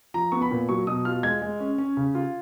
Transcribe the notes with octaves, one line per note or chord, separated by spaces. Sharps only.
F3 A#5
B3 C#6
B5
A#2
F#3 C#6
B2 D#6
F4 F6
G#3 G#6
G#3
C#4
C#4
C#3
F4